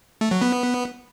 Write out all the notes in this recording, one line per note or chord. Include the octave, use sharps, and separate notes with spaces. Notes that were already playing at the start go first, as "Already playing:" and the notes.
A3
F#3
B3